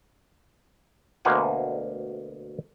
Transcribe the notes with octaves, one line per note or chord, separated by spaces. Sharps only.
D2 B2 A#3 C5 F#5 G#5